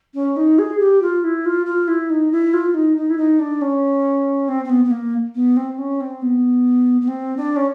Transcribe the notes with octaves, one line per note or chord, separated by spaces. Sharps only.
C#4
D#4
G#4
G4
F4
E4
F4
F4
E4
D#4
E4
F4
D#4
D#4
E4
D#4
D4
C#4
C4
C4
B3
B3
A#3
B3
C4
C#4
C4
B3
B3
C4
D4
C#4